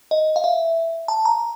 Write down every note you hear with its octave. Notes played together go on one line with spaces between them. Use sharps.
D#5
F5
E5
A5
A#5